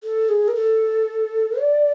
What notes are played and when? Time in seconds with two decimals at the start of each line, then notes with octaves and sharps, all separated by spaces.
0.03 A4
0.29 G#4
0.48 A#4
0.55 A4
1.60 D5